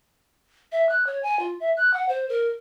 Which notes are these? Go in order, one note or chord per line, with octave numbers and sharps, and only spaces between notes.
E5
F#6
C#5
G#5
F4
E5
F#6
F#5
C5
A#4